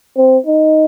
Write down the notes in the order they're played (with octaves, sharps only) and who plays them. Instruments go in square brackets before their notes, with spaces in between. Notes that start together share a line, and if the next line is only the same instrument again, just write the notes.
[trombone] C4
D#4